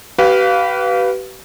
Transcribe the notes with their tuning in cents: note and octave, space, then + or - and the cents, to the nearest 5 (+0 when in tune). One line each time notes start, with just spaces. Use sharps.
G4 -40 B4 +0 F5 +0